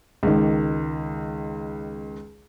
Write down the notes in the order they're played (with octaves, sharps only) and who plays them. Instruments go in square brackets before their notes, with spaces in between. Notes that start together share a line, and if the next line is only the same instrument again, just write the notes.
[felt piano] C#2 D#3